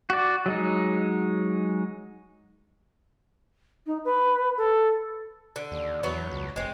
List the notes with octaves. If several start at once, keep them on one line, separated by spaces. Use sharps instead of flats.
F#4 D5
F#3 G#3 D#4
D#4
B4
A4
D3
D#2
E2 F#3 B3
C#2
F1 G#3 C4